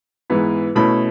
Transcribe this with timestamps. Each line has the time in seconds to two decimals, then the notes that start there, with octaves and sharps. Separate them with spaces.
0.30 G#2 E3 B3 E4
0.76 B2 A3 C#4 E4 B5